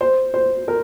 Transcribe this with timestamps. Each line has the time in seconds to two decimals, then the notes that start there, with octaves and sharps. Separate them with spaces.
0.01 C5
0.34 C5
0.68 A#4